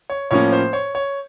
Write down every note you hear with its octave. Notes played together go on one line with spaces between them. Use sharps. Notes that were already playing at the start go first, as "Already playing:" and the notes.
C#5
A2 F3 A#3 C#4 C#5
C5
C#5
C#5